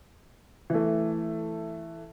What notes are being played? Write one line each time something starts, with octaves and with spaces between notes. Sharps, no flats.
E3 A3